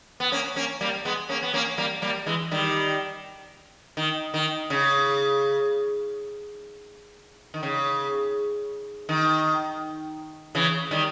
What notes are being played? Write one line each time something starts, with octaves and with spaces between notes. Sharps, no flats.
B3
A#3 C#4
A#3 C#4
G3 A#3
G#3 B3
A#3 C#4
B3
A#3 C#4
G3 A#3
G3 A#3
E3 G#3
D#3 G3
D#3
D#3
C#3
D#3
C#3
D#3
C#3 E3
D#3 G3